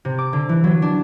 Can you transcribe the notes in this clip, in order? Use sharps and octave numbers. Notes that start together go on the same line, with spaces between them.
C3
D6
D3
E3
F#3
D4